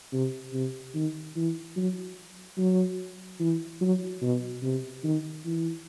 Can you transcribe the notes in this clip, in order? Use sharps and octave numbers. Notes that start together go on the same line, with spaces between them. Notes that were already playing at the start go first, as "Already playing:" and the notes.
C3
C3
D#3
E3
F#3
F#3
E3
F#3
B2
C3
D#3
E3